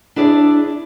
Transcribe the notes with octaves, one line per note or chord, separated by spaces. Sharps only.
D4 E4 G#4 D5